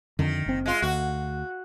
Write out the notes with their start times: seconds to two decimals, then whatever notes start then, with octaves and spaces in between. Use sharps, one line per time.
0.19 F2 D3 D#3
0.46 F#1 C4
0.66 G#3 F4
0.82 D2 F#4